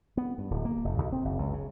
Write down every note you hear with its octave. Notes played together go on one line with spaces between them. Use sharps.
B3
G2
D1
A#3
F1
B1
C4
F#1
C#2
C#3